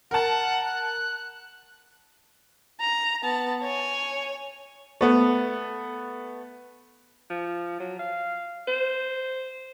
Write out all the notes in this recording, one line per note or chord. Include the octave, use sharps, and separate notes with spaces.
A#4 F#5 A5
F#6
A#5
B3 A5
C#5 G#5
A3 B3
F3
F#3
F5
C5